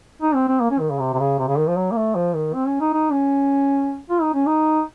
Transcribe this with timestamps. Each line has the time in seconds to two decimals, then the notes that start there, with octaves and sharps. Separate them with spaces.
0.22 D#4
0.34 C4
0.48 C4
0.60 A#3
0.71 C#4
0.80 D#3
0.90 C#3
0.99 C3
1.14 C3
1.19 C#3
1.39 C3
1.48 C#3
1.58 D#3
1.67 F3
1.76 F#3
1.91 A#3
1.96 A3
2.15 F3
2.35 D#3
2.54 C4
2.67 C#4
2.80 D#4
2.93 D#4
3.12 C#4
4.09 F4
4.21 D#4
4.34 C#4
4.46 D#4